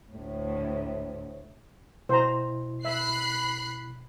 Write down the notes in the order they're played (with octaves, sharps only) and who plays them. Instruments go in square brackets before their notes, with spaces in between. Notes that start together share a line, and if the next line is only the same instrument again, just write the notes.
[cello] D2 A2
[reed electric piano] B2 E4 [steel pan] C5 A#5
[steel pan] E5 [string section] B5 F#6 C7